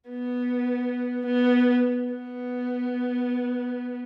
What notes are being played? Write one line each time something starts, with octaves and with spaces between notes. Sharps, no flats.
B3
B3
B3